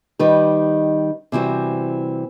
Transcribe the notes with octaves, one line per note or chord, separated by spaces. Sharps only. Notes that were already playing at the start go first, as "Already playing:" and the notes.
D#3 G3 D#4 G4 B4
C3 E3 G3 C4 F#4